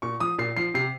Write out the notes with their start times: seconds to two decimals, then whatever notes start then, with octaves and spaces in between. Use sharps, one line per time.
0.02 A#2 C#6
0.20 F3 D#6
0.38 A#2 C7
0.57 F3 C7
0.74 C3 C7